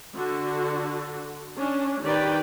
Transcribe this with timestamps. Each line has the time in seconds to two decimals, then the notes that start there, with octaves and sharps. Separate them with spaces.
0.16 D3 F#4
1.57 C#4 D4
2.04 D#3 G4 B4 D5 G5